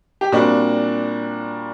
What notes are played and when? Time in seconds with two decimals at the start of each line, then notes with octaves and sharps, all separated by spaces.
0.21 G4
0.32 A#2 G3 C4 D4 F#4